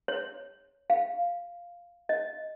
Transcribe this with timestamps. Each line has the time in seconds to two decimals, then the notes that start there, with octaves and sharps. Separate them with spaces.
0.08 C#5
0.90 F5
2.09 D#5